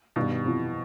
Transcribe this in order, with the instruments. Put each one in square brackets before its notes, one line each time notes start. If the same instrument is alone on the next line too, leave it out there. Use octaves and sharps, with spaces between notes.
[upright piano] G2 D#3 G3 [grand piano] B2
[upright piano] F2 C3 E3